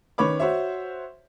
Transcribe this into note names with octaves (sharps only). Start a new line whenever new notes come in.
D#3 C#4 B4 C#5 B5 D6
F#4 C5 C#5 E5